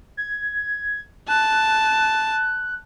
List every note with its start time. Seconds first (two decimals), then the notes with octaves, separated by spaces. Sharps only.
0.17 G#6
1.29 A5 F#6